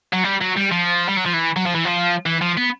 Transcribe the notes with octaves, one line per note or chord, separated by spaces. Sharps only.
F#3
G3
F#3
G3
F3
G3
F#3
F3
E3
F#3
F3
E3
F3
E3
F3
B3